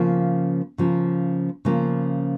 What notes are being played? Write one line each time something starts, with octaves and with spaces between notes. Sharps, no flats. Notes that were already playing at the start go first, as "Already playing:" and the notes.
Already playing: C#3 F3 A#3
C#3 F3 A#3
C#3 F3 A#3